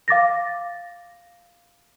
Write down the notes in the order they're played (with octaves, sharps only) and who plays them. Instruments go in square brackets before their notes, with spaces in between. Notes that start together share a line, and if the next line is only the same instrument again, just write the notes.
[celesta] F5 D6 A6 A#6